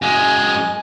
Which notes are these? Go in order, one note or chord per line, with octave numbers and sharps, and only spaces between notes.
F#2 G#3 G#5